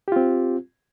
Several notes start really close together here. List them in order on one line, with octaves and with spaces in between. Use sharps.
G4 F4 C4